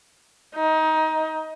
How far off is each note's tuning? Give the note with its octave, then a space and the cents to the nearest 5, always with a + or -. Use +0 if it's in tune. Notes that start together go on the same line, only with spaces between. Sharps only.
D#4 +20